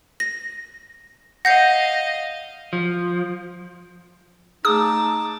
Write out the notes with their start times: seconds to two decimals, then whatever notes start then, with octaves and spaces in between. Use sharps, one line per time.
0.20 A#6
1.45 D#5 F5 F#5 G6 A#6 C7
2.73 F3
4.65 A3 D#4 G#4 A5 D6 D#6